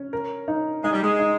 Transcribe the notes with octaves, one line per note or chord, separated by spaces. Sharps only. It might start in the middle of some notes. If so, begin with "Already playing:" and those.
Already playing: C#4
A#4
D#4
G#3 D#4
G3
G#3
D#4